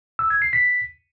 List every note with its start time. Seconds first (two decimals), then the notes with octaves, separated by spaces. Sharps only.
0.19 E6
0.30 G#6
0.42 C7
0.53 B6